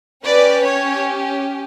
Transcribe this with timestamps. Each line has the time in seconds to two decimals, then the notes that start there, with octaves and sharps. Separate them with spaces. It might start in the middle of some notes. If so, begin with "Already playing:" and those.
0.24 C#4 G4 B4 D5
0.64 C#5